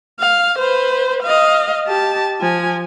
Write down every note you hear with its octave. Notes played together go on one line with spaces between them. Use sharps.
F5
B4 C5
D#5 F5
G4 A5
F3 G#5